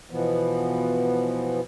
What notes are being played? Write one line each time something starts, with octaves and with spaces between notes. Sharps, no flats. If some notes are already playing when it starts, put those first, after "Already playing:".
B2 E3 F3 B3